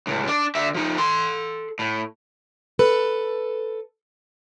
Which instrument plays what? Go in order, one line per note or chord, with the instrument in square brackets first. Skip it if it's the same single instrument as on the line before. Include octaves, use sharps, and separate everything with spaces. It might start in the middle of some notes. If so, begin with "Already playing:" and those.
[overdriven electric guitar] C#2 A2
D4 D5
D3 E5
F3 D#4
A4 C6
A2
[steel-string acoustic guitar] A4 B4